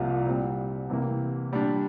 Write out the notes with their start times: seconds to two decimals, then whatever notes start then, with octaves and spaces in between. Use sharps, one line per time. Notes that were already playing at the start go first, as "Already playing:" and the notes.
Already playing: C2 C3 F3 A#3 F4
0.27 A#2 G3 C4
0.90 C3 E3 A#3
1.52 A#2 G3 D4